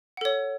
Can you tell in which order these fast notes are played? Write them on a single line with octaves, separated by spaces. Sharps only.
F#5 A4 C#5